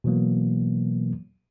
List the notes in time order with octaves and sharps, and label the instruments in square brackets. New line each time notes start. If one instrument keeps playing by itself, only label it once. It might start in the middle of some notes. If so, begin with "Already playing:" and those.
[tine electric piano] B2 E3 F#3 A#3